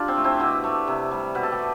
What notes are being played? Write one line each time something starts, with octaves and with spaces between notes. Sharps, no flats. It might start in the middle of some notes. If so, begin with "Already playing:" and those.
Already playing: D4 F4 G4
C4
A3
C4 E4
B2 E4 G4
A3
C3
G3
B2 B4
A4
G4
A3